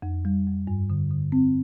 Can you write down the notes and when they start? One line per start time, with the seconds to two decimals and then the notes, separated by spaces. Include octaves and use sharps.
0.02 F2
0.25 G3
0.47 F2
0.67 G2
0.90 D3
1.11 D3
1.32 C4